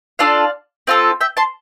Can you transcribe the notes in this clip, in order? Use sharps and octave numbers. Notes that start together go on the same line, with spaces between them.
D4 F4 A4 D5 F5
C4 F4 A4
E5 G5
A5 C6